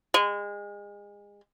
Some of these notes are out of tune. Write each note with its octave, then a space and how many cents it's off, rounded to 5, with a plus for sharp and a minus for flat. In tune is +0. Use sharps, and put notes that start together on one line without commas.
G#3 -30